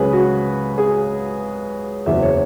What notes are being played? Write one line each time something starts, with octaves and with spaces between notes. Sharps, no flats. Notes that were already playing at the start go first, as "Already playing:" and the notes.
Already playing: C#2 C#3 F#3 G#4 B4
F#4
G#4
F#1 E2 C#3 F#3 E5
C#5